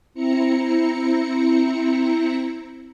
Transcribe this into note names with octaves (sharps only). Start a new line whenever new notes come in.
C4 E4 A#5 C#7